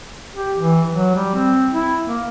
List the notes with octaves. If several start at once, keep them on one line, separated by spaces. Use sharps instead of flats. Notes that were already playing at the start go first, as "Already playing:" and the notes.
G4
E3
F#3
G3
C4
E4
A#3